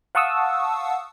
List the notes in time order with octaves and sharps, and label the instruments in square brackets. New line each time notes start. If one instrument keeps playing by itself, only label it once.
[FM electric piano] F5 F#5 A5 C#6 D#6 E6